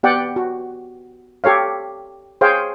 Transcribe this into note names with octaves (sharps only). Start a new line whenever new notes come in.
B3 G4 D5 F#5 G5
F#4
G4 A4 C#5 F5
G#4 C5 C#5 F5 G5